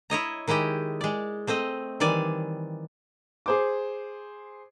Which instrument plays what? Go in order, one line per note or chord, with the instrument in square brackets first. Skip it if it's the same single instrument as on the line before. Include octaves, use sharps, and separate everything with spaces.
[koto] E4 C#5 D#5 A#5
D#3 G#3 E4 G4 D#5
G#3 D5
A3 C4 C5 D#5
D#3 E3 G3 D5 G#5
[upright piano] G#4 C5 D6